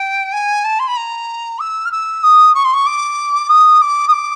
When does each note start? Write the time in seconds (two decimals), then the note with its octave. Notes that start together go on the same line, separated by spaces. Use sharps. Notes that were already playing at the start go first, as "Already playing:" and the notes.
Already playing: G5
0.32 G#5
0.64 A5
0.79 C6
0.87 B5
0.96 A#5
1.59 E6
1.85 F6
1.91 E6
2.23 D#6
2.54 C#6
2.64 C6
2.73 C#6
2.86 D6
3.49 D#6
3.81 D6
4.08 D#6
4.12 D6